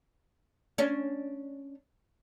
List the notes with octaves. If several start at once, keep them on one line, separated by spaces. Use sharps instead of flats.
C#4 D4